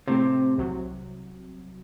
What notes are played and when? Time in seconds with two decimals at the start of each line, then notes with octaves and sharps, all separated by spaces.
0.07 A2 C3 A3 C4
0.58 C2 C3 F#3